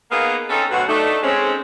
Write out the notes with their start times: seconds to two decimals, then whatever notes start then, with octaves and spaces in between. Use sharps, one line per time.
0.11 A#3 B3 D#4 G#4 A#4 F5
0.50 C4 C#4 D#4 A4
0.71 D2 B2 F#3 F#5
0.88 A3 D4 D#4
1.23 G#3 C4 C#4